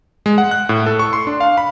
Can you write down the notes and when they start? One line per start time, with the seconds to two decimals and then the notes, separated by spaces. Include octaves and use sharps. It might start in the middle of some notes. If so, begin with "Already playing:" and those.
0.26 G#3
0.38 F#5
0.51 F#6
0.69 A2
0.86 A4
0.99 C#6
1.13 C6
1.27 D4
1.40 F5
1.57 B5